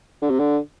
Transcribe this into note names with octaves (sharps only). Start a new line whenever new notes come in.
D3
C3
D3